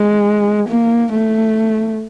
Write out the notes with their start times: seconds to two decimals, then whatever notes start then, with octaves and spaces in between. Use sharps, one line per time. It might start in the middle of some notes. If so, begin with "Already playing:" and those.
Already playing: G#3
0.68 A#3
1.12 A3